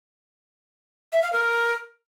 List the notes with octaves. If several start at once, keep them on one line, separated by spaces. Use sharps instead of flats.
E5
F5
A#4